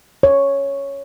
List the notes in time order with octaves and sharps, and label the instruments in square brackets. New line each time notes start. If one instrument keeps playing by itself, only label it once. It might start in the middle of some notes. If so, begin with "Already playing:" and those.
[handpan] C#5